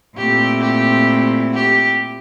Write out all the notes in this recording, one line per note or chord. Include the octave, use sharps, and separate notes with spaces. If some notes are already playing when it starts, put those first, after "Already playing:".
A#2 A3 C4 E4 G4
G4
G4